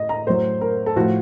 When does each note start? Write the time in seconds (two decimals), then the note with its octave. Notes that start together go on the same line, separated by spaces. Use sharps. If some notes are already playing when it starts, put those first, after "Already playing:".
Already playing: A2 D#5
0.09 A#5
0.27 A2 F#3 C5
0.61 A#4
0.86 A4
0.96 A2 F3 F#4